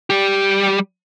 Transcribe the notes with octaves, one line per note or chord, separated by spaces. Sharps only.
G3 G4